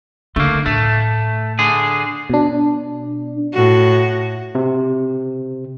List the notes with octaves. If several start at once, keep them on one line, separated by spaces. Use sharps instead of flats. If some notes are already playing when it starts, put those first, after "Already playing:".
D3 A3 A#3
A2 A3
D3 G#4
B2 D4
A2 F#4
C3